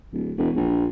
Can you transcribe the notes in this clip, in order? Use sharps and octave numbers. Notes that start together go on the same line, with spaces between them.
D1
E1
A#1